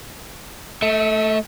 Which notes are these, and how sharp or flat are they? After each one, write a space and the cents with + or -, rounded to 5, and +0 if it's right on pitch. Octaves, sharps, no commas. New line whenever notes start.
A3 +0 E5 -40